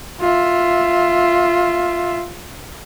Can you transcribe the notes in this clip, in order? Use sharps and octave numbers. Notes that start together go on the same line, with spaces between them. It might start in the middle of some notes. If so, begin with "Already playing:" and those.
F4 E5